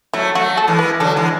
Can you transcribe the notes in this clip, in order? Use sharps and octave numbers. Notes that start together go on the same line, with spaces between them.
F#3 A3 E4
F#3 A3 F#4
A4
E3 G#3
B4
D3 F#3 A4
E3 G#3